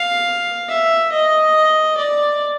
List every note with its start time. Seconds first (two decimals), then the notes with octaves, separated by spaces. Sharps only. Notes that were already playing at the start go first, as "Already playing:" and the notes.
Already playing: F5
0.69 E5
1.12 D#5
1.97 D5